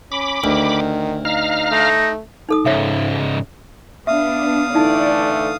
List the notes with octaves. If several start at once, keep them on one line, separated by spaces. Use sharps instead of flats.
C#4 B5 D6
D2 D#3
D#4 F5 A#5 F6
A3 D#4
D#4 A4 D#6
C#2 G#2 C#5 E5
B3 D4 E5 F5 D#6
D3 E3 A3 D#4 E4 D5 A5